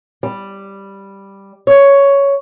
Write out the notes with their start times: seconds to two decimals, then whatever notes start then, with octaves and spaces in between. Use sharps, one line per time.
0.23 G3
1.67 C#5